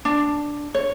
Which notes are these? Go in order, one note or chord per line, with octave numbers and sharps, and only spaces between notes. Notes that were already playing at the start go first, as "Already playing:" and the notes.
D4
C#5